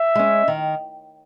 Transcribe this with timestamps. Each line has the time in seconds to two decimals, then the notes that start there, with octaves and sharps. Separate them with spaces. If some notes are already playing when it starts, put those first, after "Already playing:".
Already playing: E5
0.15 G#3 C#4
0.48 D#3